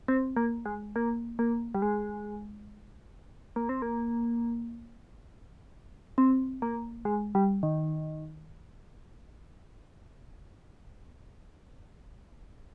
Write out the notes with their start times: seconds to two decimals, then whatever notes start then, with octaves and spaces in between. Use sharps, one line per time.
0.08 C4
0.36 A#3
0.66 G#3
0.96 A#3
1.39 A#3
1.74 G3
1.82 G#3
3.56 A#3
3.69 C4
3.82 A#3
6.18 C4
6.62 A#3
7.05 G#3
7.35 G3
7.63 D#3